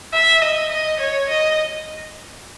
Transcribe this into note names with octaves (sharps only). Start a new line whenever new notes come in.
E5
D#5
D#5
C#5
D#5